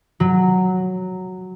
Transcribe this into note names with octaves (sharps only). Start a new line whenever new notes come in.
F#3